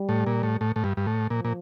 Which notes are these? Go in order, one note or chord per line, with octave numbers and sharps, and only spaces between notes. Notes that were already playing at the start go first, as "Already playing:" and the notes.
Already playing: G3
A2
A#2
A2
A2
A2
G2
G2
A2
A#2 F3
A#2